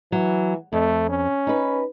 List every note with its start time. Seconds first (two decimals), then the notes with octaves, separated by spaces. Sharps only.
0.12 E3 F#3
0.73 F2 A3
1.09 C#4
1.47 D#4 B4